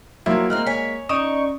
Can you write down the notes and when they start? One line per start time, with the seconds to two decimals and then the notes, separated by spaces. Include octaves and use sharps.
0.26 F3 F#3 A#3 E4
0.50 G#3 A#3 C4 A#4 B4 F6
0.66 C#5 G#5 B6
1.09 C#4 D#4 D5 C#6 D#6